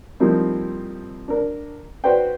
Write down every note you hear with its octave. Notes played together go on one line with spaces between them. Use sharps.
F3 G3 A#3 C4 D#4 E4
D4 A#4
F#4 B4 C5 D5 G5